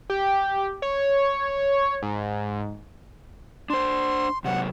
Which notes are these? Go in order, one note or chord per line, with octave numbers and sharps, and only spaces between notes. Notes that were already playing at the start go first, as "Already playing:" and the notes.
G4
C#5
G#2
D4 C5 C6
C3 F#3 F#5